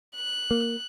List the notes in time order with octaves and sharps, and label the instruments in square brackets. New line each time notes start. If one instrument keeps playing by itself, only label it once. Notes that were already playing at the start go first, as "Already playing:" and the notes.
[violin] F#6
[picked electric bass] A#3